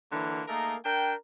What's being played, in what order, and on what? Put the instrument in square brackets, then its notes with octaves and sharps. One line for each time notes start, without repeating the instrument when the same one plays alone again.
[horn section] D3 E3 F#3 A#3
A3 A#3 D#4 G#4 A#4
D4 A#4 G5